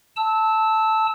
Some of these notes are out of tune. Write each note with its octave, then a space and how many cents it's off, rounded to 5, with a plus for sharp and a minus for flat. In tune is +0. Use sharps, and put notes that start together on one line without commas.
A5 +0 E6 -20